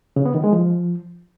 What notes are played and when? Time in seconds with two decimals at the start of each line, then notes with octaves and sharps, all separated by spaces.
0.16 C#3
0.26 B3
0.35 D#3
0.44 G#3
0.53 F3